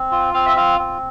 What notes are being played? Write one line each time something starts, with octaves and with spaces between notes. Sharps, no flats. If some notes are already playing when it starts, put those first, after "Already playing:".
Already playing: C4
F4
C4 F5
E5
F4 F5
C4